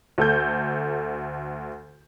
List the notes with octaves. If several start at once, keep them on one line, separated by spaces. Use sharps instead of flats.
D2 A4 G6